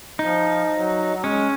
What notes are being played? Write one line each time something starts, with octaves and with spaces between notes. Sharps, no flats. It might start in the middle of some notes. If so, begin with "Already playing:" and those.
F3 D#4
F#3
F#3
G#3 C#4